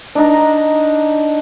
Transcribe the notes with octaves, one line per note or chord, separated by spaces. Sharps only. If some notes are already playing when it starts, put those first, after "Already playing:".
D4 D#4 A#5